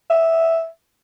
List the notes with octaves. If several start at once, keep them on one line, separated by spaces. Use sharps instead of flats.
E5